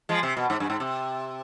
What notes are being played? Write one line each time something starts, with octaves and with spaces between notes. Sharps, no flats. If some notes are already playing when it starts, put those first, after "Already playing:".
F3 G#3
C3
B2
G#2
G2
G#2
C3